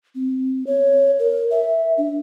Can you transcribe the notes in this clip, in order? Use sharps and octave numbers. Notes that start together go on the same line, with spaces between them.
C4
C#5
A#4
E5
D4